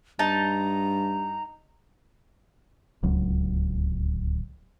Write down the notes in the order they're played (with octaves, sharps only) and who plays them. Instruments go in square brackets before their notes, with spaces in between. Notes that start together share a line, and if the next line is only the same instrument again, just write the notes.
[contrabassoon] G2 [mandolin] D#4 A5 [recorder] A#5
[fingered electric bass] D1 C#2 F#3